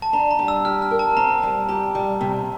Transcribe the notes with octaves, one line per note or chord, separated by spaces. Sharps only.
A5
D4 A#5
A#5
G3
E6
G4 F6
F6
A#4
A5
C4 A#5
G3
G4 A#5
G3
C3